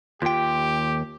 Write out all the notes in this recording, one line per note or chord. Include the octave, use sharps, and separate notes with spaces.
D#2 F4 G4 G5